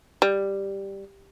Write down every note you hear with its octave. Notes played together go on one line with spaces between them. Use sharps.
G3